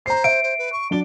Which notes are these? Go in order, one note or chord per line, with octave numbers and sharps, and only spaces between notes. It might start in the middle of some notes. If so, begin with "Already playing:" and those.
C5 A#5 C7
E5 D7
C5
B4
C#6
F#3 D4 D5 G7